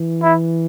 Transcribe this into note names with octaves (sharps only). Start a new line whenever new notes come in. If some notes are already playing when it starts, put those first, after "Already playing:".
Already playing: E3
E4